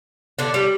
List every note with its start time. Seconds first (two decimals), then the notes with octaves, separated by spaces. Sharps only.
0.39 D3 D4
0.54 G3